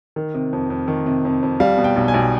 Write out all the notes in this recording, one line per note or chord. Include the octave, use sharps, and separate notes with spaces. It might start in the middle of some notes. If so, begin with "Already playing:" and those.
D#3
C3
F2
F2
D#3
C3
F2
F2
G3 F5
B2
G5
B1
G#5
B1